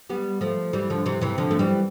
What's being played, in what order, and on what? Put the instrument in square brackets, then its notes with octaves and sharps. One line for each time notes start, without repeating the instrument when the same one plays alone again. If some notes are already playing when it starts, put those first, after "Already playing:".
[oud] G3 B3
F3 A3
E3 G3
D3 F3
C3 E3
C3 E3
D3 F3
A3
E3 G3